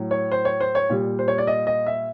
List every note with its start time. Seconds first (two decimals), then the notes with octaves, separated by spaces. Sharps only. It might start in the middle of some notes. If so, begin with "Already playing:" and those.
Already playing: A2 F#3
0.11 C#5
0.32 C5
0.45 C#5
0.61 C5
0.75 C#5
0.90 A#2 G3
1.19 C5
1.28 C#5
1.38 D5
1.47 D#5
1.67 D#5
1.86 E5